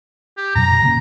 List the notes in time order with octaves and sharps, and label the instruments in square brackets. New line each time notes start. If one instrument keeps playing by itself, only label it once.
[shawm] G4
[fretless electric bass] F#2 B2 F#3 [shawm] A#5
[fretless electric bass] B2
D3 A#3 C#4